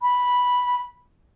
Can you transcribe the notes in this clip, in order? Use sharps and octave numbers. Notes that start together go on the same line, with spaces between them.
B5